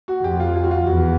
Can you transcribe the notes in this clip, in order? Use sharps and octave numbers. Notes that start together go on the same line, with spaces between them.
F#4
F2 G4
F4
F4
F#4
F4
E2 F#4